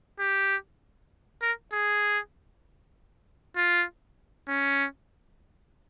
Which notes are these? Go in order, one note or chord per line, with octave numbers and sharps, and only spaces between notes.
G4
A#4
G#4
F4
C#4